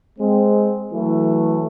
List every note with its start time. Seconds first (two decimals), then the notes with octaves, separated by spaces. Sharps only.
0.19 G#3 C4
0.92 E3 F#3 A3